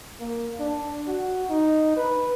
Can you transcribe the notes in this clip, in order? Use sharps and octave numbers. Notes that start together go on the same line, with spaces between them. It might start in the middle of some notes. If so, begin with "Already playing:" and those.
A#3
D4
F#4
D#4
B4